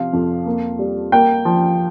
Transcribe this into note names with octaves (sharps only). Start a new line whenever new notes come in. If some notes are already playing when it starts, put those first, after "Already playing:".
Already playing: C3 F3 F5
F2
A#3
G3
A#3 G5
F3